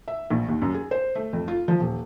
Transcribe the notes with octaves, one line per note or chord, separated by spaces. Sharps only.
E5
A#1
D#2
F#2
G#4
C5
A3
F2
F4
F3
D#1